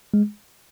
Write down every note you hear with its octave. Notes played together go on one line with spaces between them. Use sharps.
G#3